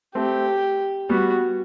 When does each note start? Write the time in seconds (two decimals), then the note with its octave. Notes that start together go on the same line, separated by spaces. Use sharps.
0.15 A3 C4 G4
1.09 G3 B3 F#4